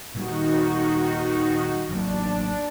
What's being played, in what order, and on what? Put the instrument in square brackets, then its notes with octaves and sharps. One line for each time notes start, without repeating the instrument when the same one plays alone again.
[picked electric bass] A#2 G3 [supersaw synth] D#3 D#4 F#4
[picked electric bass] A1 F#3 A#3 [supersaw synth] D4